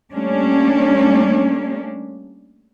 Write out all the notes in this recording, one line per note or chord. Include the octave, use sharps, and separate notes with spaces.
G3 A3 A#3 C#4 D4